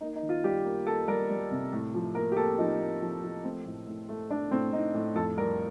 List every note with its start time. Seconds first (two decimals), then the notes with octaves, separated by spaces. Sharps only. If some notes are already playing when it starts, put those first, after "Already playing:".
0.01 A#3 D#4
0.16 D#4
0.22 D#3
0.29 F4
0.44 G3 G4
0.65 A#3
0.86 A#3 A4
1.08 G3 A#4
1.30 G3
1.51 C3
1.73 A2
1.95 F3
2.15 A#3 A#4
2.32 G4
2.37 A#3 A4
2.58 F3 D#4
2.80 A#3
3.02 F3
3.23 F3
3.44 A3 C4
3.66 A2
3.87 A2
4.09 A3
4.30 A3 D4
4.51 A2 C4
4.72 A2 D#4
4.94 A2
5.15 F2 A4
5.38 G3 A#4